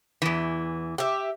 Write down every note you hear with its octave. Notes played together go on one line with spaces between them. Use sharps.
E2 E3
G4 E5